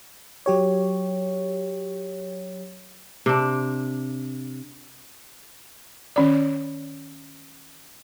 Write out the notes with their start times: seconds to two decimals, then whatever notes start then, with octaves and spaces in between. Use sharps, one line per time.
0.46 F#3 G4 C#5
3.26 C3 D4
6.16 D#3 C#4 D5